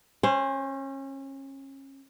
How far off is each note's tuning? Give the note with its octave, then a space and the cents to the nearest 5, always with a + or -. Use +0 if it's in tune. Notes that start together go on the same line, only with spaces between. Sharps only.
C#4 -30 C5 +0